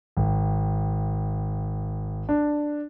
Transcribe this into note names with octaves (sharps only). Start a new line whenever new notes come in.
G#1
D4